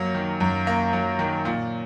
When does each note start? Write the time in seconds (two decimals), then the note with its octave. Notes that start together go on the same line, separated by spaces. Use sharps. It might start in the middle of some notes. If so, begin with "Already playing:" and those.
Already playing: F#2 F#3 A#3
0.15 D#3
0.40 F#2
0.67 A#3
0.93 F#3
1.19 D#3
1.45 A#2